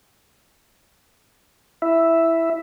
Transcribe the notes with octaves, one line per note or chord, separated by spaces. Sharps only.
E4 E5